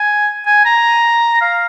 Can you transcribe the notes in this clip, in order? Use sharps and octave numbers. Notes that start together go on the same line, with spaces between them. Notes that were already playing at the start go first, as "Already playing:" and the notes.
Already playing: G#5
G#5
A#5
F5